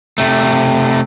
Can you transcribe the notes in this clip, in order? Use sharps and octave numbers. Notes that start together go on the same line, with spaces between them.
C3 A3